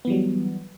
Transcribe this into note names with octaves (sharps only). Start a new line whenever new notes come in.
E3 F#3 G3 B3